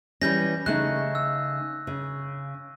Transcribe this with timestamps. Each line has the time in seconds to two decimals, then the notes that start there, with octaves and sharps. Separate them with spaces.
0.22 E3 G3 C#4 G6 A#6
0.66 C#3 A3 D#4 F#6
1.15 E6
1.87 C#3